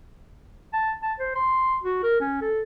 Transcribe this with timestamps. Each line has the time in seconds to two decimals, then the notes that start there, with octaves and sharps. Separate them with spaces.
0.73 A5
1.02 A5
1.19 C5
1.35 C6
1.83 F#4
2.03 A#4
2.20 C#4
2.41 A4